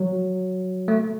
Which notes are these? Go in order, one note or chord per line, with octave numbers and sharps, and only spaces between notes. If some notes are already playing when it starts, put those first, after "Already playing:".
Already playing: F#3
A3